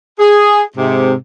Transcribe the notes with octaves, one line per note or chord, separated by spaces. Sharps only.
G#4
G#2 C3